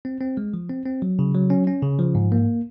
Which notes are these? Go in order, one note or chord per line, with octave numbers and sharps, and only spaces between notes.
C4
C4
G#3
F3
C4
C4
F#3
C#3
F#3
C#4
C#4
C#3
F3
G#2
A#3